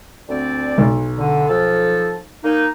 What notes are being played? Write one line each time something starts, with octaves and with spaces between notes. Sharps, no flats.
D2 C4 D5
B1
D3
F3 A4
A#3 D#4